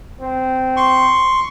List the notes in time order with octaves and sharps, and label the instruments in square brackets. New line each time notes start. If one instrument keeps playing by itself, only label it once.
[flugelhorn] C4
[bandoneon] C6 C#6